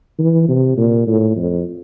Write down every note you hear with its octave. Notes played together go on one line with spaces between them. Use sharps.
E3
C3
A#2
A2
F2